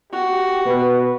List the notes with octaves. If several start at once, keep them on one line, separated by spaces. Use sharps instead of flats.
F#4 G4
B2 B4